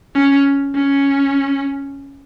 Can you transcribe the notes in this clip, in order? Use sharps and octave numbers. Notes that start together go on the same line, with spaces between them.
C#4
C#4